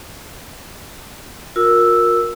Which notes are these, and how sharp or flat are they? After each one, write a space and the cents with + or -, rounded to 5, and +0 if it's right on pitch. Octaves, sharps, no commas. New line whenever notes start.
F4 +45 A#4 +0 E6 +0